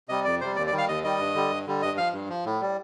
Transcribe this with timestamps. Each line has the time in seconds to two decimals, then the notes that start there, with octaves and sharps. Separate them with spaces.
0.09 C3 G3 D#5
0.24 F2 D5
0.41 C3 G3 C5
0.56 D#2 D5
0.67 D5
0.72 D#3 G3
0.78 F5
0.88 D#2 D#5
1.03 D#3 G3 D#5
1.19 G2
1.35 D3 G3
1.50 G2
1.67 D3 G3
1.82 G2 D#5
1.98 F3 F5
2.13 G2
2.29 F3
2.45 A2
2.61 G3